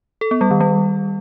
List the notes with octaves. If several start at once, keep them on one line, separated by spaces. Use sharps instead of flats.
A4
B3
G3
D#3
G3